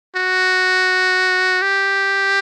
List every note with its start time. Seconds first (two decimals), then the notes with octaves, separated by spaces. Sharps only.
0.16 F#4
1.62 G4